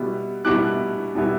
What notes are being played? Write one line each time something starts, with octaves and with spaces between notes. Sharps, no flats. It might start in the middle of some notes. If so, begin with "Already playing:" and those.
Already playing: B2 G3 B3 E4
B2 G3 B3 E4 D6 F#6
B2 G3 B3 E4